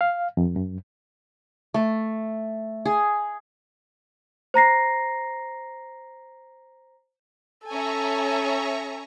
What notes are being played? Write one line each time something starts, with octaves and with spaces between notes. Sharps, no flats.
F5
F2
F#2
A3
G#4
C5 A#5 A#6 C7
C#4 A4 E5 G#5 A#5 C#6